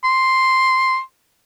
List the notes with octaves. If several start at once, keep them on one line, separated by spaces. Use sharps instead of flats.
C6